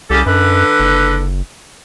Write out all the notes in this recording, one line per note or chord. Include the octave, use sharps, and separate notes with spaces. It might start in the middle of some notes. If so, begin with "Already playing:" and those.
C2 C#3 G4 A4
F#2 D3 B4
F#1